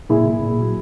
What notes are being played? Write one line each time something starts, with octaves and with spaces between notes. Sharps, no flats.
A#2 E4 G#4
A#2
A#2
F#3